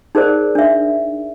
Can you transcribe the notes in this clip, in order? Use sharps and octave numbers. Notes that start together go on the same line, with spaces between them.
D#4 G#4 A#4 C5 D5
D4 E5